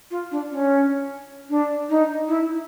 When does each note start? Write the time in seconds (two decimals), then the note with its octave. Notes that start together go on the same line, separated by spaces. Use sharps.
0.11 F4
0.31 D4
0.50 C#4
1.50 D4
1.89 D#4
2.28 E4